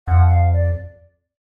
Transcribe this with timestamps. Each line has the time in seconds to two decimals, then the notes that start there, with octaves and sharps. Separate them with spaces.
0.07 F2 F#5
0.29 F5
0.53 D5